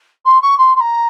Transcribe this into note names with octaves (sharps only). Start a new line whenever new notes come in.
C6
C#6
C6
C6
A#5